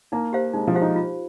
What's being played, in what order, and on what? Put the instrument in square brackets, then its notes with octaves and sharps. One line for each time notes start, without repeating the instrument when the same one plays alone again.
[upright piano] A#3 [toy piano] D#4
[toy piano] G4 C5 F5
[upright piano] G#3 [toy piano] D#4
[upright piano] F3
[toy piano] G4 C5 F5
[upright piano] D#4
[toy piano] F4